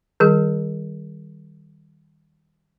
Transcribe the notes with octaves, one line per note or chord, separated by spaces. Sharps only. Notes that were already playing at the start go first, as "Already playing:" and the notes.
D#3 G3 G#4